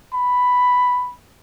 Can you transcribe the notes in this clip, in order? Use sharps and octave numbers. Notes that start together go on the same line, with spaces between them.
B5